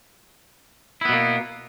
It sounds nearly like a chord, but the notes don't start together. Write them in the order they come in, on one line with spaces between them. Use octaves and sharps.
E4 B3 B2 A#3